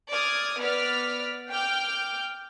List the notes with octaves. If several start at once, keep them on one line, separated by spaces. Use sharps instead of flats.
D5 D#6 F6 G#6
B3 D5 F6 B6
G5 D6 F6 G6